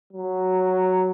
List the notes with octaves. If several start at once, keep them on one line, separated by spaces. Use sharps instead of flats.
F#3